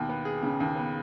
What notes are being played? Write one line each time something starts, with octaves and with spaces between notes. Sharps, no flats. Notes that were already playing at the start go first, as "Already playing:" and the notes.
Already playing: D#2 B2
B3
G#4
C#3
D#2
B3